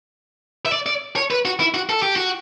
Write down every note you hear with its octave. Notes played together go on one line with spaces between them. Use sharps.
E5
D5
D5
C#5
B4
F#4
E4
F#4
A4
G4
F#4